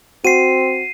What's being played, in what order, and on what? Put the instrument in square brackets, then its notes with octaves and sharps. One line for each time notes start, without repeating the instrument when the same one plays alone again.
[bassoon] C4 [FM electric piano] F#4 [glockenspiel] C7 D#7